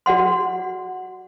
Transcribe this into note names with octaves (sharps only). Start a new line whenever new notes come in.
F#4 D5 F#5 C6